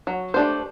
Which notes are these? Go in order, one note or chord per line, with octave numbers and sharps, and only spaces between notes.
F#3
A3 D4 G4 C5